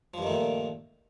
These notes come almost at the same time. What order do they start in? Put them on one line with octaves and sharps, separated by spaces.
F3 G2 D#3 A3 A#2